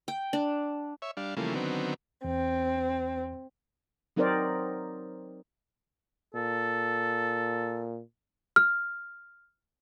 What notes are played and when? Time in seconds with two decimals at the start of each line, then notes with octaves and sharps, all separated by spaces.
0.08 G5
0.33 D4
1.02 C#5 E5
1.17 G3 D4 F5
1.37 C#3 E3 F3 G3 A3 A#3
1.55 D3 D#3 F#3 B3 C4
2.24 E2 C4
4.16 F#3 C4 D#4 A#4 C5 D5
6.35 A#2 A4
8.56 F6